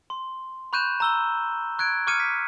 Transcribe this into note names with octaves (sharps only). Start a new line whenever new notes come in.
C6
B5 C#6 F#6 G6 D#7 E7
A#5 E6 G7
C#6 F#6 G#6 D7
C#6 D6 F6 G#6 C#7 D#7
B6